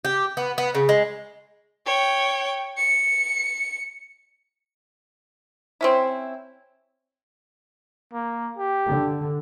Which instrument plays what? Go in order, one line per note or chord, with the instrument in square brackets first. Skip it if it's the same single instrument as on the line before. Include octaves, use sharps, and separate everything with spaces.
[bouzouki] G4
B3
B3
C#3
G#3
[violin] C#5 G5
C#7
[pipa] C4 C#4 E4
[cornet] A#3
G4
[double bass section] D3